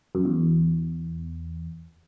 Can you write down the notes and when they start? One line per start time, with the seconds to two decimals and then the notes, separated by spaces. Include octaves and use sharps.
0.15 F#2
0.25 E2